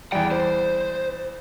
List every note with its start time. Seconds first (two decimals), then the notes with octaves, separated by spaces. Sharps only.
0.12 E2 G3 F#5 G5
0.31 C5